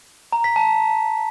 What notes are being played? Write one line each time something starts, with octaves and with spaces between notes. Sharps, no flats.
A#5
B6
A5